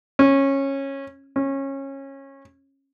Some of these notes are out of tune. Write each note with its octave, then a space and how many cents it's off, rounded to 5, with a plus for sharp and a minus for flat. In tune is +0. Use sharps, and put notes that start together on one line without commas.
C#4 -15
C#4 -20